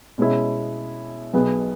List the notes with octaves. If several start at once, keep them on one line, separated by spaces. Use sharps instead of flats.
B2 G#3 C#4 E4
B1 B2 B3 G#4